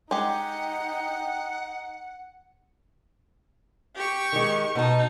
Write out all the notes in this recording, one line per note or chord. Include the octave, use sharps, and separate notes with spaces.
G#3 D#4 G4 F#5 G5
G4 C#6
D#3 G#3
B2 D#4 A5